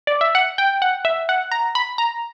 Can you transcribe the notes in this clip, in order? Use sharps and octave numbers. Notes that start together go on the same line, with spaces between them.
D5
E5
F#5
G5
F#5
E5
F#5
A#5
B5
A#5